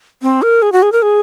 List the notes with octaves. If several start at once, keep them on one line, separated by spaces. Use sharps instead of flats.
C4
A#4
G#4
F#4
G#4
A#4
G#4